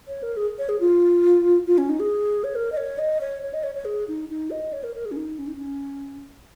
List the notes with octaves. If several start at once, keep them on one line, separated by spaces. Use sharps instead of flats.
C#5
A#4
G#4
C#5
G#4
F4
F4
C#4
D#4
G#4
C#5
A#4
D#5
C#5
D#5
C#5
C#5
D#5
C#5
C#5
G#4
D#4
D#4
D#5
C#5
A#4
A#4
G#4
C#4
D#4
C#4
D#4
C#4